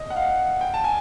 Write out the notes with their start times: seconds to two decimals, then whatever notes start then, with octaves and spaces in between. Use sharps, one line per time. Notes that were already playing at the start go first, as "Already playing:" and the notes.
Already playing: D#5
0.10 F#5
0.16 F5
0.61 G5
0.74 A5
0.84 G#5